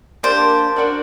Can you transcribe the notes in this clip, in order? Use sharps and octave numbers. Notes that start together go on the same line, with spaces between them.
A#3 D4 G4 C5
D4 F#4 A#4 D5